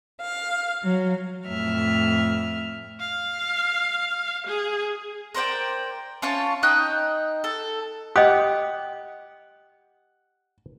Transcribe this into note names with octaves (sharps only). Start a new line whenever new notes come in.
F5
F#3
F2 A2 E5 F6
F5
G#4
A#4 C5 D5 G5
C#4 F4 C#5 A5
D#4 G5 D#6 F#6
A4
G4 D#5 F#5 D#6